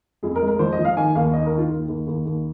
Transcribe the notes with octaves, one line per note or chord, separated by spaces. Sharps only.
F2 G#4
A#4
G#3
A#4
F3 C5
D#5
F3
F5
D#3 G#5
D#2 F5
D#3 D#5
A#4
D#3
F4
D#2
D#2
D#2
D#2